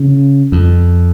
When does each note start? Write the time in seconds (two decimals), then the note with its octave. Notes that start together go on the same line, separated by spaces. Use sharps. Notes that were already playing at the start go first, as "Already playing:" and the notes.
Already playing: C#3
0.52 F2